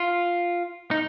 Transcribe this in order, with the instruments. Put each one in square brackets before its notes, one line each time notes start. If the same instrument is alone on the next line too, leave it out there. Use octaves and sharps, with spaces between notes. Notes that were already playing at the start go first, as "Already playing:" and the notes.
Already playing: [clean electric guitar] F4
D#4